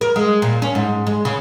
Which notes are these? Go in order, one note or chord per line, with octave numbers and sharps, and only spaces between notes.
A#4
G#3
A#2
C#4
G#2
G#3
C#3